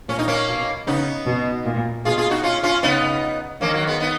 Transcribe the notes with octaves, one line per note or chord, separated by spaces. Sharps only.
A#2 C#4
D#4
A#3 C#4
B2
C#3 B3 D#4
B2
A#2
B2 F4 G#4
F4 G#4
D#4 F#4
C#4 F4
C#4 F4
C#3 B3 D#4
D#3 A#3 C#4
F#3 A#3
G#3 B3
B3 D#4